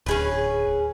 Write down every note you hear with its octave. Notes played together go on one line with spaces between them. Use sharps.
D1 C#4 G#4 B4